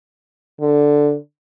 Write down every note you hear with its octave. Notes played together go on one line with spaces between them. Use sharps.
D3